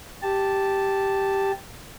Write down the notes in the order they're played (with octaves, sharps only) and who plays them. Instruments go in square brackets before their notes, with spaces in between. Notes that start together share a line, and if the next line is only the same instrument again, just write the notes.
[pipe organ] G4 A5